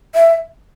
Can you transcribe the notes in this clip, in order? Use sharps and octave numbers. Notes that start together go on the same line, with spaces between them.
E5